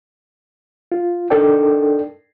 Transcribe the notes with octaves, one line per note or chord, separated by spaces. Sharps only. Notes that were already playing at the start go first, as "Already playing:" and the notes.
F4
D4 D#4 A4 A#4 D5 G5